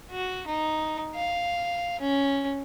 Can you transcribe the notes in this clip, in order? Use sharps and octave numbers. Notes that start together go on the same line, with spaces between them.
F#4
D#4
F5
C#4